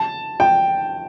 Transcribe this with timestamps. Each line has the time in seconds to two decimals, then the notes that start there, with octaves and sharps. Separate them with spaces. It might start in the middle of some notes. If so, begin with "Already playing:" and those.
Already playing: A5
0.40 G5